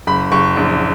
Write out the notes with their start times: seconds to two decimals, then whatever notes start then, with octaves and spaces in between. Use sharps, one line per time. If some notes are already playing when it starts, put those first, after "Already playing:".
0.07 F#1 B5
0.32 F#1 C#6
0.57 A#1